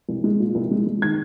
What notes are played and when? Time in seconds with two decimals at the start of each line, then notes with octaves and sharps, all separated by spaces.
0.09 C2
0.24 G#3
0.40 A#2
0.55 C2
0.71 G#3
0.86 G#3
1.02 D#3 G#6